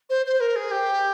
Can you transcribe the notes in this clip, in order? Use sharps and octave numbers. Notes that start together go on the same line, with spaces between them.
C5
C5
A#4
G#4
G4